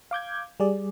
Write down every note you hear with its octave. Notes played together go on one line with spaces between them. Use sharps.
F5 D6 G6 G#6
G3 G#4 D5